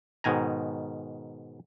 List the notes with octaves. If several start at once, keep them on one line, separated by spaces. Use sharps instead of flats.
G#2 B2 D#3 G#5 A#5